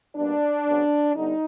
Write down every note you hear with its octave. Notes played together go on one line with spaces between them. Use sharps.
B2 G3 A#3 D4
C#3 F#3 B3
D3 G3 B3 D#4